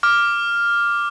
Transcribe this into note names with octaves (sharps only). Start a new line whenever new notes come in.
D6 F6